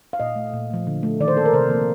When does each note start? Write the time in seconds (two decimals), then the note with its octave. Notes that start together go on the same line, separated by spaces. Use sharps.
0.13 F5
0.20 A#2 D#5
0.36 A3
0.54 A#2
0.70 F3 A3
0.87 D3
1.03 A3
1.20 D#3 D5
1.28 C5
1.36 A#3 A4
1.46 A#4
1.53 C3 C5
1.70 F3 A#3